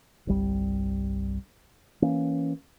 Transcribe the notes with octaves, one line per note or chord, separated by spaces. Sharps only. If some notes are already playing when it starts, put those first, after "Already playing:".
G1 C2 G3
E3 A#3 C#4